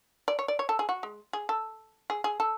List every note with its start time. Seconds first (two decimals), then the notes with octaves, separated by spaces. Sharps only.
0.28 D5
0.39 C#5
0.48 D5
0.59 C#5
0.69 A4
0.79 G#4
0.89 F#4
1.03 G#3
1.33 G#4
1.49 A4
2.10 G#4
2.24 G#4
2.40 A4